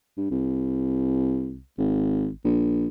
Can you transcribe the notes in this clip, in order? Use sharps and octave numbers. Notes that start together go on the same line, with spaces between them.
G2
C2
G#1
A#1